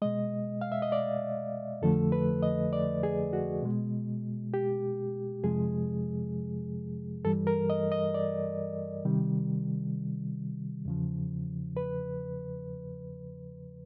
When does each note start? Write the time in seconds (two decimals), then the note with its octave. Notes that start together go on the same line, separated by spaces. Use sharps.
0.02 B2 G#3 D#5
0.61 F5
0.72 E5
0.82 D#5
0.92 D5
1.82 F2 D3 F3 A3 A4
2.12 B4
2.43 D#5
2.73 D5
3.03 G#4
3.33 F#4
3.62 B2 G#3
4.54 G4
5.44 F2 C3 F3 G#3 G#4
7.25 G2 E3 G3 A4
7.47 A#4
7.70 D#5
7.92 D#5
8.14 D5
9.05 C3 D#3 G3
10.85 E2 C#3 F3
11.77 B4